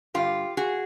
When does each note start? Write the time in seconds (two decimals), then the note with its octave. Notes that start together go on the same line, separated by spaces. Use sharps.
0.14 G2 D3 F4 G4
0.57 F#4 G#4